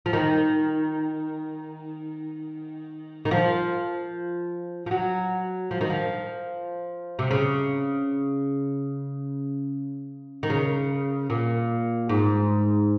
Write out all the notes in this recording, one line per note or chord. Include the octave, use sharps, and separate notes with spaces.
F3
D#3
D#3
F3
F3
F#3
F3
D#3
F3
C3
C#3
D#3
C#3
A#2
G#2